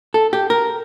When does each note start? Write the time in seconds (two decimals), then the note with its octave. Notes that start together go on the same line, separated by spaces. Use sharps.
0.14 A4
0.33 G4
0.50 A#4